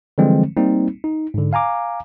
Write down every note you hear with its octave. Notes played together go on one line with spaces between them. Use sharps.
D3 E3 F3 G3 G#3 C4
G3 A#3 C4 D#4
D#4
G#2 D3
F5 G#5 A#5 D6